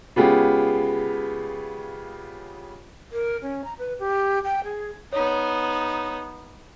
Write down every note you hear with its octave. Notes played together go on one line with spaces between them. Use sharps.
C#3 G#3 B3 F4 G4 G#4
A#4
C#4
A#5
B4
G4
G5
G#4
B3 D#4 C#5